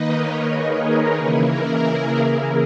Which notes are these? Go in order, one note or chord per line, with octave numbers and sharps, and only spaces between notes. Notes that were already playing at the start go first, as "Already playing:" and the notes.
Already playing: D#3 A#3 D#4 B4 D#5
A#4 C#5
G#4 B4
C#3 E3 A#3 E4
A#4
G#4